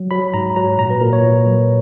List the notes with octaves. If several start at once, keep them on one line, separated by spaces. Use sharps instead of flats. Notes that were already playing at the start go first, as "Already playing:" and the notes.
Already playing: F#3
F#3 B5
G#2 A#5
F#3 A#5
A#2 A#5
B4
A#2 A#4
C#5
A#2
F#3